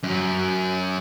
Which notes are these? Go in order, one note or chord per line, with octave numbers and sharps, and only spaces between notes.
F#2